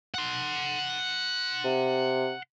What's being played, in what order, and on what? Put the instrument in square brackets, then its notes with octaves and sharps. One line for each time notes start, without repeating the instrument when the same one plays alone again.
[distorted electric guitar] F#5 C6
[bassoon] C3